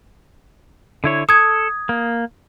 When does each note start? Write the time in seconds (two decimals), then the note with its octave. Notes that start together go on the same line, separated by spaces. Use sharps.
1.04 D3 E4 C#5
1.29 A4 D#6 G#6
1.89 A#3